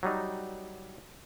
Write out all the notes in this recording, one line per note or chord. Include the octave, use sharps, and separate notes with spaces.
F#3 G3 D#4